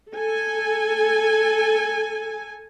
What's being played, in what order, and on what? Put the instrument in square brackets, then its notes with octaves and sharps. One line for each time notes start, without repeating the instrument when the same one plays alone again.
[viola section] A4 G#5